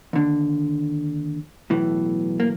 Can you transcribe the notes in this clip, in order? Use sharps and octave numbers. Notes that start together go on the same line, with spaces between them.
D#2 D3
B1 A2 E3
A#3